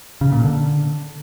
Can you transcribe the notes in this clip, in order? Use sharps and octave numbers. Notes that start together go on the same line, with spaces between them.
C#3
A#2
D3